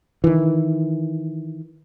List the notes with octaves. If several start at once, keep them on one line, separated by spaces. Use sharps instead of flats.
D#3 E3